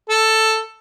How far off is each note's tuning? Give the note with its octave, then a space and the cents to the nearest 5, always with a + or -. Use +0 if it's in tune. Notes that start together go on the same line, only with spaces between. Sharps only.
A4 +5